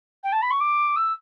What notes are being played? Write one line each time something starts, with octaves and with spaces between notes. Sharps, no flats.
G5
A5
B5
C#6
D6
E6